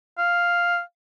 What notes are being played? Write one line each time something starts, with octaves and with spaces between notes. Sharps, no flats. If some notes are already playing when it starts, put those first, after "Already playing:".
F5